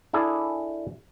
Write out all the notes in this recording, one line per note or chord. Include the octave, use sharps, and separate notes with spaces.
D4 E4 G#4 A4